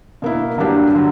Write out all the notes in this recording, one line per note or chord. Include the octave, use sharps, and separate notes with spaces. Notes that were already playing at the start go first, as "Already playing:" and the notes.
B2 A#3 E4
G2 F#3 A#3 D4 G4
D3 F#3